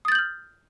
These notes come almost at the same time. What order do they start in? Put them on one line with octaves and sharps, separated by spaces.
D#6 A6 G6 F#7 F6